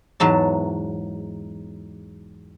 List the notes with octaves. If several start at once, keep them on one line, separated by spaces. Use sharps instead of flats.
E2 G#2 F#3 A5